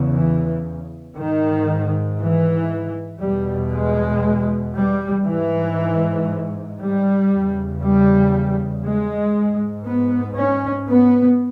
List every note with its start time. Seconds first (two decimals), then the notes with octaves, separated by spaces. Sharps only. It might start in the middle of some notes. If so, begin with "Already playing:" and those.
Already playing: E2 C#3
0.14 E3
1.16 G#2 D#3
2.19 E3
3.21 E2 B2 G3
3.72 G#3
4.74 G3
5.25 G#2 E3
6.78 G3
7.29 E2 C#3
7.81 G3
8.83 G#3
9.34 G#2
9.85 B3
10.36 C#4
10.87 B3